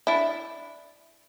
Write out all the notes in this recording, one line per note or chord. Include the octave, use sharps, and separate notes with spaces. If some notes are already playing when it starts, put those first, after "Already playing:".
D4 E4